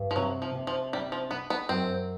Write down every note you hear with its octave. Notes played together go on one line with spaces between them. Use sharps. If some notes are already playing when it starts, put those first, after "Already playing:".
Already playing: G2
F3
C3 F#3
F3
C3
F3
G3 D4
F3
B3 D4
B3
F#2 C4